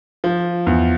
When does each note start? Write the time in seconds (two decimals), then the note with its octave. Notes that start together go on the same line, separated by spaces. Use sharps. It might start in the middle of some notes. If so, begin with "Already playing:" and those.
0.24 F3
0.67 E2